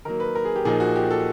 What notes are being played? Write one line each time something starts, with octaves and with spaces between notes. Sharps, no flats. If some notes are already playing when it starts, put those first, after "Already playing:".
D#3 F#3 A#3 A#4
B4
A#4
G#4
G4
A#2 F3 A#3 D#4 G#4
F#4
G4
A4